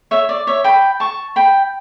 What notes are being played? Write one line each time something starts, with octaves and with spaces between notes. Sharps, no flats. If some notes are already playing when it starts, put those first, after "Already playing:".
C#5 E5
D5
C#5 E5
G5 B5
A5 C#6
G5 B5